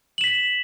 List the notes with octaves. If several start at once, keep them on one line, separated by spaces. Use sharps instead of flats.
B6 E7 F#7